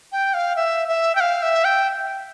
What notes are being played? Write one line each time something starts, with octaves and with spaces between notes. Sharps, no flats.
G5
F5
E5
E5
G5
F5
E5
G5